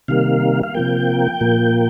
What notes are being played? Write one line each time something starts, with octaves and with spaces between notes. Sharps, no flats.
C3 D#3 G3 A#3 F5
F5
C3 F3 A#3 G5
A#2 F3 A#3